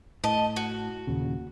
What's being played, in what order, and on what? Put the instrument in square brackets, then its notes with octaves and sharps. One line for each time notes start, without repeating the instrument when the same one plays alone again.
[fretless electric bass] A2 [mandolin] D#5 A5
[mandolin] F#4
[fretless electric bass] D#2 A#2 C#3